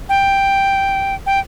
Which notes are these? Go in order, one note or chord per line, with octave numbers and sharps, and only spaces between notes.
G5
G5